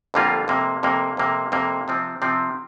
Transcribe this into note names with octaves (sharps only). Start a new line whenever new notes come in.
F2 D3 G3 A#3 F4
F2 C3 A#3
F2 C3 A#3
F2 C3 A#3
F2 C3 A#3
C3 F3 C4
C3 F3 C4